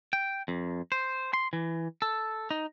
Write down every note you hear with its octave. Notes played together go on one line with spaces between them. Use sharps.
G5
F2
C5
C6
E3
A4
D#4